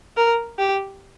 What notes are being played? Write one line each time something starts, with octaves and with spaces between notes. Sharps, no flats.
A#4
G4